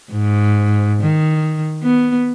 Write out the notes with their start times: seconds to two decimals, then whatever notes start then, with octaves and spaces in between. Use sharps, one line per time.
0.12 G#2
1.01 D#3
1.83 B3